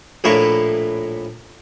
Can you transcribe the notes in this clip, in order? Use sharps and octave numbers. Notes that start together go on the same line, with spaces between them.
A#1 A2 A#3 E4 C#5 C#6